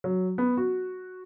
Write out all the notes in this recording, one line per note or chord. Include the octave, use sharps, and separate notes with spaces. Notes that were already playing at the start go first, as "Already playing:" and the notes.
F#3
B3
F#4